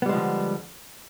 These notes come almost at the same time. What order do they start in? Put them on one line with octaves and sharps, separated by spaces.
B3 G3 G#3 F3 D3